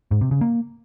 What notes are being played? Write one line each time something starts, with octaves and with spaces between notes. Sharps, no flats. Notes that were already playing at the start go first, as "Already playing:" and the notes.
G#2
C3
C#3
A#3